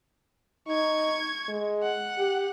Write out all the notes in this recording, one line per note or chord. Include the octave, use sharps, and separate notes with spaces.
D#4 C#6 G#6
G#3
F#5
G4